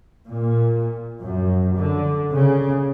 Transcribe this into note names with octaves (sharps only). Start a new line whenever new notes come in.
A#2
F#2
D3
C#3